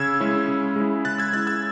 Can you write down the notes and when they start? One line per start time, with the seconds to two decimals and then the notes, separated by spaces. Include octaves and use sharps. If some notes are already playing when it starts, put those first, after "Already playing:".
Already playing: C#3 E6 G#6
0.20 G#3 C#4 E4
0.48 C#3
0.76 G#3 C#4 E4
1.05 C#3 F#6 A6
1.18 E6 G#6
1.33 G#3 C#4 E4 F#6 A6
1.47 E6 G#6